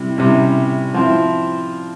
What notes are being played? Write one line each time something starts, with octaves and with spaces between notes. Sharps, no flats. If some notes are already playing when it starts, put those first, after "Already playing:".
Already playing: C3 G3 E4
C3 G3 C#4 E4
F3 C4 E4